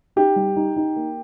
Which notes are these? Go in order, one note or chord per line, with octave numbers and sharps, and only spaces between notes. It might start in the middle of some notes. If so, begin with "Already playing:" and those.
D#4 G4
G3
D#4
D#4
A#3